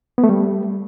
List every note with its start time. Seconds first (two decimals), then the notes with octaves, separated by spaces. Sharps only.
0.18 B3
0.24 A3
0.29 G3